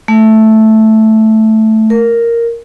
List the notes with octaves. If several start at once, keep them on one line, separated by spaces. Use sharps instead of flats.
A3
A#4